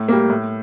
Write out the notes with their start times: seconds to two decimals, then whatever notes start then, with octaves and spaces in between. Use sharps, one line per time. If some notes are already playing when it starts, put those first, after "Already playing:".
Already playing: A2
0.08 G3 A#3
0.30 A2